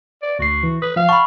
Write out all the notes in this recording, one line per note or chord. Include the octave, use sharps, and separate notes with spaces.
D5
D2 F#4 C7
E3
B4 D#6
F3 F5
F#5 A5 B5 C#6